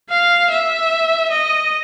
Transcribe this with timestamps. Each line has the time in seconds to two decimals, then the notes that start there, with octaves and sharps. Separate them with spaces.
0.10 F5
0.51 E5
1.31 D#5